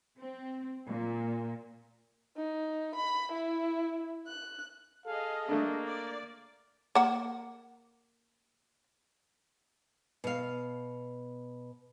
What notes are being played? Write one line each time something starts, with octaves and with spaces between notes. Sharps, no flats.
C4
A#2
D#4
B5
E4
F#6
G#4 A4 D#5 F5
A3 A#3 D4
D5
A#3 F#5
B2 F5